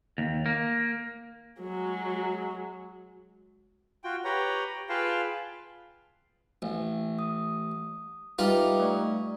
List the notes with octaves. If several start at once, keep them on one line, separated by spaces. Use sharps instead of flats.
D#2
A#3
F#3 G#3
F4 F#4 G5
G4 B4 C#5 G5 A#5
F4 G#4 B4 F5 G5 A5
A1
D#6
G3 D#4 F4 B4 E5 D6
A3 D5 C#6